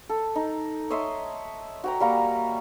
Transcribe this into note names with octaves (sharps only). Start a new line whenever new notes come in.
A4
D#4
C#5 D#5 E5 C6
F#4 G5 A#5
G3 A#3 F#4